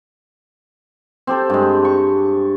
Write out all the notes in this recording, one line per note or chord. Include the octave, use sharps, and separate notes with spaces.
C4 G4 A4
G2 G#3
G5 C#6